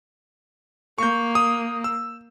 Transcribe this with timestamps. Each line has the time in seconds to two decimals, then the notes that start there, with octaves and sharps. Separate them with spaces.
0.98 A#3 C#6 G6
1.35 D#6
1.84 E6